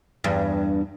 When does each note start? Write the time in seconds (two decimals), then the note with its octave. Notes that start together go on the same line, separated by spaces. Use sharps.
0.24 E2 G2